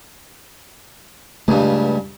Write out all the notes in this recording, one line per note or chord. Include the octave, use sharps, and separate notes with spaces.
C#2 G2 A3 C4 D4